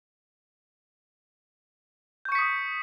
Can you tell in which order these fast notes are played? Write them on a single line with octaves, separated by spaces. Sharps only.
G6 C#6 C#7 B6 D#6